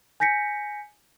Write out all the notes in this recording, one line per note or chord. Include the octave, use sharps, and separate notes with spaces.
G#5 G6 A#6 B6 C#7